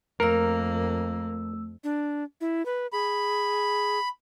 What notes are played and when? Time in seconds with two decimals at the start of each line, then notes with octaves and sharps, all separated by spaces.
0.20 F2 A3 A#3 A#4 E6
1.84 D4
2.41 E4
2.66 B4
2.93 G#4 B5